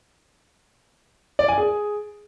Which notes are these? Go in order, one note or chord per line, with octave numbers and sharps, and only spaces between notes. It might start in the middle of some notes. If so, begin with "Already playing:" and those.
D5
G#5
G#4